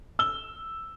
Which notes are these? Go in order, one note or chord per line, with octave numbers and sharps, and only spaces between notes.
E6 G7